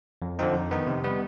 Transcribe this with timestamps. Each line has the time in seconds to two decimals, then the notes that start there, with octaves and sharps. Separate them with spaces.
0.22 F2
0.39 D3 F3 C4 D#4
0.54 F2
0.71 D#3 B3 D#4
0.87 C3
1.04 G3 B3